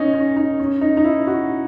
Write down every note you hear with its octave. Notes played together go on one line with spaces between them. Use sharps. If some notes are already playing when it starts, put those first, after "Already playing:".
Already playing: C#4 D#4
C#4
D#4
C#4
D#4
D#4
E4
F#4